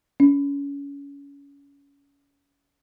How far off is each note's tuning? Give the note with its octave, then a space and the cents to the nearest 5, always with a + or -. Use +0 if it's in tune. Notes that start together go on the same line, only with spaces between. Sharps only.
C#4 +30